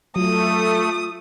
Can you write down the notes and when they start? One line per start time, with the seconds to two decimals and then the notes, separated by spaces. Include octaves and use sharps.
0.16 F#3 A3 F4 D#6